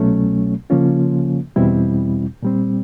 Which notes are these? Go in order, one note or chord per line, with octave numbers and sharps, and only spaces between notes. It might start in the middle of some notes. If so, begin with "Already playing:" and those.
Already playing: C2 B2 F#3 A3 C#4
C#3 F3 A#3 C#4 F4
E2 B2 G3 C4 E4
A#2 G3 C4